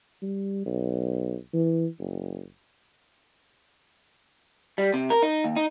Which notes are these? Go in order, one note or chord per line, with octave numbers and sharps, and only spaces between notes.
G3
B1
E3
F#1
G3
C3
A#4
D#4
D#2
D#4